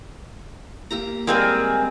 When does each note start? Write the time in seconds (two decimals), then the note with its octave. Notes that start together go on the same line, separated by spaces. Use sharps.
0.91 A#3 G4 A#5
1.27 G3 G#3 A#3 C4 G#4